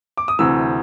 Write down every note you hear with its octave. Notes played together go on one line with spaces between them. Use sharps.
D6
D#6
D2 C3 E3 E6